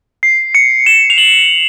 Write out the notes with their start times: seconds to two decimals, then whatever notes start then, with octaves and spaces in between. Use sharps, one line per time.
0.23 C7
0.55 C#7
0.86 E7
1.10 F7
1.18 F#7